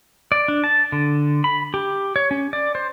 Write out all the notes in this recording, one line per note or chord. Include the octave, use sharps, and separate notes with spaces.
D5
D4
A5
D3
B5
G4
C#5
C#4
D5
C5